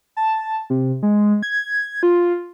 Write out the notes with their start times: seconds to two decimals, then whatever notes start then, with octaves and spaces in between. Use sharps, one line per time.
0.17 A5
0.70 C3
1.03 G#3
1.43 G#6
2.03 F4